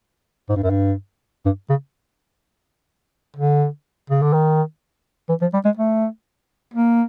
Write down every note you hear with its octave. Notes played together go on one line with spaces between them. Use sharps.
G#2
G2
F#2
G2
G2
C#3
D3
C#3
D3
D#3
E3
F3
G3
G#3
A3
A#3